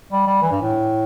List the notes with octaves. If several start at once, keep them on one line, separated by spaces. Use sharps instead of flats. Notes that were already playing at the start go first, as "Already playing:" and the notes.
G3
G3
E3
G2
A2